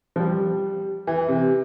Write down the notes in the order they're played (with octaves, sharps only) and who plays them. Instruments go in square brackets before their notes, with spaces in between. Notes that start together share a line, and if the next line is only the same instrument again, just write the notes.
[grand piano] F3
G3
E3
C3